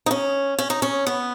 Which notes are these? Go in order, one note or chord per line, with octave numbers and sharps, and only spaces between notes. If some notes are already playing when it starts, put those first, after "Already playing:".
D#4
C#4
C#4
D#4
C#4
B3